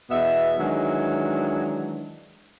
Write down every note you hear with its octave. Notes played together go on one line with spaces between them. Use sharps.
E2 B2 B3 E5
D#3 E3 F#3 G#3 D4